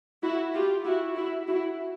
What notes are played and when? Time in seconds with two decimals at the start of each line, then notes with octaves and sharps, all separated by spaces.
0.23 E4 F#4
0.54 F4 G4
0.85 E4 F#4
1.16 E4 F#4
1.48 E4 F#4